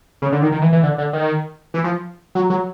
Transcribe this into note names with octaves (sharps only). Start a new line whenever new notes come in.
C#3
D3
D#3
D#3
E3
E3
D3
D3
D#3
E3
F3
F#3
F#3